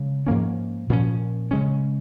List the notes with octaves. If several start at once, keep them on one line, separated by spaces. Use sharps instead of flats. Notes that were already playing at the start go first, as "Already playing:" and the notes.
Already playing: C#3 G#3
G#2 F3 A#3 C#4
A#2 F3 C#4
C#3 G#3 C#4